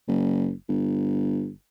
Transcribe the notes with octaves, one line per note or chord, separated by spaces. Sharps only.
F#1
G1